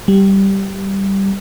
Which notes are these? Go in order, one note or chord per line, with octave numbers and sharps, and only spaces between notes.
G3